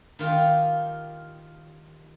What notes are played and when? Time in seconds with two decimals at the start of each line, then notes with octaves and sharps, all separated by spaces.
0.19 D#3 F4 G4